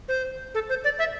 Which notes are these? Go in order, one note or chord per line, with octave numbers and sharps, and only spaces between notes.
C5
A4
C5
D5
E5